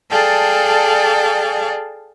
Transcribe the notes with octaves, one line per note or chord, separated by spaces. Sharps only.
G#4 A4 D5 F5 G5 A5